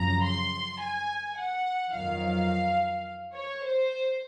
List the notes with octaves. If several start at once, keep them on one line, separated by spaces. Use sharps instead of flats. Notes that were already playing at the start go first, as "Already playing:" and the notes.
Already playing: F#2 C#3 F3 A#5
C6
G#5
F#5
F2 D#3 F#3 F5
C#5
C5